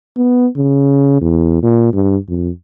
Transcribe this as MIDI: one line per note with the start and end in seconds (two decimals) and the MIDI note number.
0.17 0.47 59
0.57 1.18 49
1.21 1.60 40
1.63 1.91 46
1.93 2.17 43
2.29 2.49 41